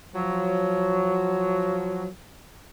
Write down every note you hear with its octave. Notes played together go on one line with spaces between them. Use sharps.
F3 F#3